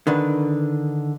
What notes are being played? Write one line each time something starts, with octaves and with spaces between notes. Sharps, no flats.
D3 D#3 B4